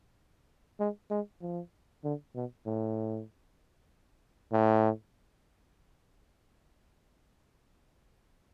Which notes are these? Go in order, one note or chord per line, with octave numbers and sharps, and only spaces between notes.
G#3
G#3
F3
D3
B2
A2
A2